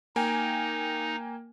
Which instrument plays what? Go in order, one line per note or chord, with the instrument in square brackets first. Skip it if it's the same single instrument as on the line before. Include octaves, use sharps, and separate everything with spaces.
[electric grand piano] A#3 G5 G#5 [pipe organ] D#4